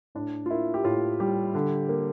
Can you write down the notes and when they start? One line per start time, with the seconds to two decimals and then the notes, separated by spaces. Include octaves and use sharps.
0.15 A2 D4
0.46 F4
0.50 A#3 E4
0.74 G4
0.84 A2 F4
1.20 G3 G4
1.55 D3
1.89 A#3